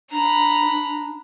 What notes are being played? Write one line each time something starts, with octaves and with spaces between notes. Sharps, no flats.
D4 A#5 B5